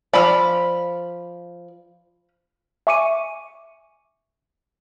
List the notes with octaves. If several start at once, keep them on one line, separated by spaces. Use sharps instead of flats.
F3 D5 B5 E6 F6
E5 G#5 C#6 D6 C#7 D#7